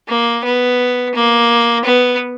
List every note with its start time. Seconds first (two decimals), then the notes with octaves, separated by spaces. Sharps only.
0.08 A#3
0.44 B3
1.14 A#3
1.85 B3